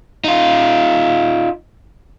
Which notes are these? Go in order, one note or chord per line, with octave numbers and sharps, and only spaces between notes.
D#4 F4